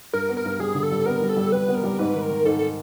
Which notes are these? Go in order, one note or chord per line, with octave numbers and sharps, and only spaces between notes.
G2 A#4
B3
A#4
G2
G3 G#4
D3
A4
G3
B3 A#4
G3
A4
G3
G3 B4
B3
A#4
G3
G#2 B4
D#3
A#4
D#3
G#2 A4
A4